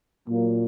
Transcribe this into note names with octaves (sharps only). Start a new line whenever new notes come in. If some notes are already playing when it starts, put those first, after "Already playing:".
A#2 F#3 A#3